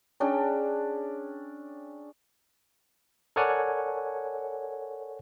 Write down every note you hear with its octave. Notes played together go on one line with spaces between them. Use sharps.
C#4 D4 G#4 G5
A4 A#4 C#5 D5 F#5 G#5